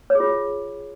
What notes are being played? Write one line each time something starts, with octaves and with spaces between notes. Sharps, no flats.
C#5
G#4
F4